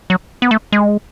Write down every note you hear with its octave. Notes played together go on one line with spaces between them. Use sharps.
F#3
B3
A3
G#3